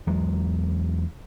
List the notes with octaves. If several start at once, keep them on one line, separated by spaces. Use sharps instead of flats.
E2 F#3 G#3